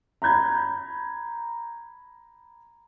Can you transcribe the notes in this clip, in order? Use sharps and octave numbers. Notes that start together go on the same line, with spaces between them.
A#5 B5 G6 G#6